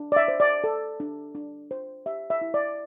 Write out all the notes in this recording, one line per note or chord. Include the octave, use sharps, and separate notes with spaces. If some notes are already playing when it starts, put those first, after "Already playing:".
Already playing: D4
D5
E5
C5
D5
A4
D4
D4
C5
G4 E5
E5
E4
D5